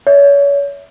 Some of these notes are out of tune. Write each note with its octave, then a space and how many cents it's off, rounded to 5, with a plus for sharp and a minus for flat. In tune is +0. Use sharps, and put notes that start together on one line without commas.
C#5 +35 E5 -10